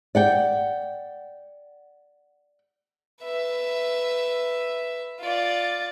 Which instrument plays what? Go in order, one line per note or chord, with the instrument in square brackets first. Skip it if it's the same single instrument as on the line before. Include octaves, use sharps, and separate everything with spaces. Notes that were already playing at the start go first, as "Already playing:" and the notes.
[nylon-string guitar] D5 F#5 G5
[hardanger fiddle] B4 E5
F4 D5